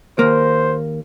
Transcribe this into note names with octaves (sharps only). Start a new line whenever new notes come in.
D#2 A#3 C5